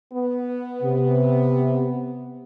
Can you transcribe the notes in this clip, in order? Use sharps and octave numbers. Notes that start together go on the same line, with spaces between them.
B3
C3